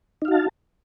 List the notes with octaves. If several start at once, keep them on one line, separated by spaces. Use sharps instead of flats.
D#4 F#4 F5 A5